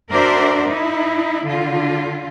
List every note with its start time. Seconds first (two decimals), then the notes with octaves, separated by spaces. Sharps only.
0.11 D4 F#4 A#4 C5 D5 E5
0.68 D#4 E4
1.46 D3 F4